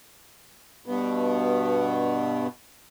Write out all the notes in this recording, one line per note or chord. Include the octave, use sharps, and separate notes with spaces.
G2 B2 B3